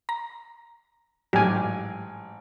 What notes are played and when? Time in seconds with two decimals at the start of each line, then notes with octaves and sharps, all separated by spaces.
0.09 A#5
1.33 A1 G#2 F#3 G4 G#5